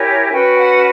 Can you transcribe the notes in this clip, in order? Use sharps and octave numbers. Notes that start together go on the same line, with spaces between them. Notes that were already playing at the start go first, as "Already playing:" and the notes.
Already playing: E4 G4 A#4 C#5 G#5
C#4 F#4 B4 G5
F#5